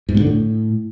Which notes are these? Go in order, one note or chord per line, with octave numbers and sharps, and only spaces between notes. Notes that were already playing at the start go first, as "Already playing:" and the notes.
G#2
B2
D3
A2